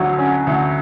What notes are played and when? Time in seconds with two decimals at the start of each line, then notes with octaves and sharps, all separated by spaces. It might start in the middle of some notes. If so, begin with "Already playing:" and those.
Already playing: D2 D3 F#3
0.18 C#4
0.47 D2